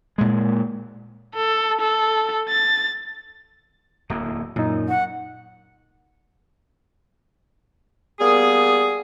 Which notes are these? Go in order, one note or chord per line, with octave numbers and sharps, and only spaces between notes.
A#2 G#3
A4
A4
A6
D1 E2 A#3
F#2 A#2 D#4
F#5
G3 A#3 B3 G#4